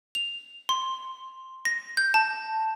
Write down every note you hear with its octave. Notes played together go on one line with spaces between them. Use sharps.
F7
C6
A#6
G6
A5